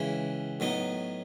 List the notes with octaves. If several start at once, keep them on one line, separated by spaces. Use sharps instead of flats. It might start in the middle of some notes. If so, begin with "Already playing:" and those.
Already playing: C#2 C#3 E3
A2 F#3 B3 D#4